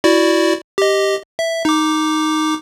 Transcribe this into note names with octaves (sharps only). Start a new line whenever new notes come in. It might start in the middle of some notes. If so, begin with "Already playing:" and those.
E4 F#4 D5
G4 D#5
E5
D#4 D6